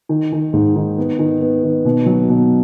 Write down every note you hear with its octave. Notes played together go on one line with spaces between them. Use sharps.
D#3
D#3
G#2
D#3
B3
D#3
B3
D#3
B2
F#3
B2